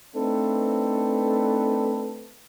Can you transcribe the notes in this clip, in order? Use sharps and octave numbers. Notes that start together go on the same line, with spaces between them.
A3 C4 D4 D#4 A4 B4